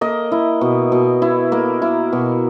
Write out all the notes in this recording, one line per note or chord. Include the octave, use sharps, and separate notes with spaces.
A#3 D#5
E4
B2
B2
E4
A#3
E4
B2